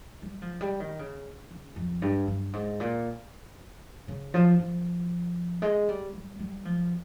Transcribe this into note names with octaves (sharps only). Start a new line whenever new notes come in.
G3
F3
G3
D#3
C#3
C#3
F2
G2
G2
G#2
A#2
C#3
F3
F3
G#3
G3
G3
G3
F3